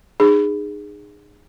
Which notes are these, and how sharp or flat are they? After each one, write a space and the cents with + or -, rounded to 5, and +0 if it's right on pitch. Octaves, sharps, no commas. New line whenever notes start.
D#4 -35 G#4 -15